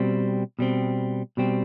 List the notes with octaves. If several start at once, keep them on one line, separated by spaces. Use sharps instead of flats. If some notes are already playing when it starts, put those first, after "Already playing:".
Already playing: B2 G3 C4
B2 G3 C4
B2 G3 C4